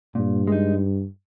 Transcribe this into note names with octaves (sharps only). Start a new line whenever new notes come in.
G2 A#2
G#3 D#4